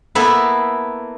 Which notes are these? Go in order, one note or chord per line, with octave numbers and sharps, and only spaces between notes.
A#3 B3 E4 A4 B4